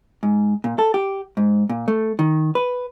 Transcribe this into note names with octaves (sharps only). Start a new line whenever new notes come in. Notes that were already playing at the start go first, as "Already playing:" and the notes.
G#2
A#2
A4
G4
G#2
A#2
A3
D#3
B4